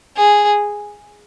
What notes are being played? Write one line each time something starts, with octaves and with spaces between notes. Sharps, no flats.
G#4